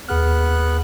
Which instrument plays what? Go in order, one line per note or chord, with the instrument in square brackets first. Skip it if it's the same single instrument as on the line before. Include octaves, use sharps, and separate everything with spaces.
[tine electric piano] D#2 G#4 F6 [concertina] B3 F#6